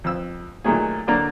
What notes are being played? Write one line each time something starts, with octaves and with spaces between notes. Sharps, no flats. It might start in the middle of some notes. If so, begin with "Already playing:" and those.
F2 E6
A#2 D#3 F#3 A3 G#4
D3 F#3 A#3 D5 A#5